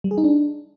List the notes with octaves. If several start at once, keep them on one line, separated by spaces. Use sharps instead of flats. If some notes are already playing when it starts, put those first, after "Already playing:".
G3
G#4
D#4
D4